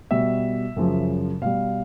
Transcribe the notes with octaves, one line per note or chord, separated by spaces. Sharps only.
B2 G3 E5
F#2 C#3 F3
B2 G3 F5